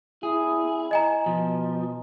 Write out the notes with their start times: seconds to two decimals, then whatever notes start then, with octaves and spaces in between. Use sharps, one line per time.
0.23 E4 G#4
0.91 D#5 G#5 A#5
1.26 B2 F3